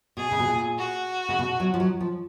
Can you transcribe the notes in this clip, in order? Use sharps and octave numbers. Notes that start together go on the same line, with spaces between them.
B2 G#4
C#3
B2
A#2
F#4
C#3
B2
F#3
F3
F#3
F3